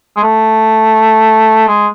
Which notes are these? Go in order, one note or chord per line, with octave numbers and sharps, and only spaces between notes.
G#3
A3
G#3